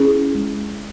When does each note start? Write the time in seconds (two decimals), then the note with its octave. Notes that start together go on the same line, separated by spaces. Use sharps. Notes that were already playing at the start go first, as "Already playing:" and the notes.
Already playing: C#4 E4 G#4
0.35 G#3